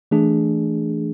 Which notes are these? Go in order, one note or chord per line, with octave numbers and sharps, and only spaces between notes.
E3 A3 D4 G#4